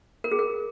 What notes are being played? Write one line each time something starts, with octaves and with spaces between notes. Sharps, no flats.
A#4
G#4
A#4